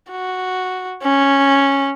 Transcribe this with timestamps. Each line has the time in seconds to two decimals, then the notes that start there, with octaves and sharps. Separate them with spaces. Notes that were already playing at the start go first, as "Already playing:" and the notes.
0.11 F#4
1.02 C#4